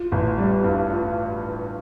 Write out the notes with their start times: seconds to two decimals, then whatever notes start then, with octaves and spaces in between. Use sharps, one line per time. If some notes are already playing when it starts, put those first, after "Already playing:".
Already playing: F4
0.12 A1
0.38 G3
0.64 G2
0.92 F4